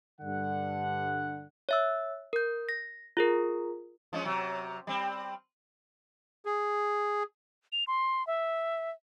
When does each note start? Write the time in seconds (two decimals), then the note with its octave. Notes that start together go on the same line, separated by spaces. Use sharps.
0.21 G2 D3 F#5
1.69 C#5 E5 E6
2.33 A#4 G6
2.69 A#6
3.17 F4 G#4 A#4
4.13 F3 G#3 C#4
4.25 C3 F#3
4.87 G3 C4
6.45 G#4
7.72 F7
7.87 C6
8.27 E5